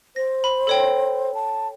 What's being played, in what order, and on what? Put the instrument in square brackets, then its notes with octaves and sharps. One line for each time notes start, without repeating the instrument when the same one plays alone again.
[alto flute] C5 [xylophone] A#6
[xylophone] B5
A4 C#5 G5
[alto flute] A5